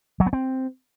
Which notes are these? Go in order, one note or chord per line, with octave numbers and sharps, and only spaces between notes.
F#3
B3
C4